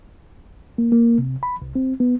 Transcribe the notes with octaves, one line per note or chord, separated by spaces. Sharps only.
A#3
A#3
C3
B5
C2
C4
B3